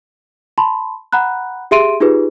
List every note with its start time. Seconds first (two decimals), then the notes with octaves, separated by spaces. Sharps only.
0.58 A5 B5 C6
1.12 F#5 A#5 B5 F#6
1.71 G4 G#4 E5 C6 D7 D#7
2.00 D#4 F4 G4 G#4 B4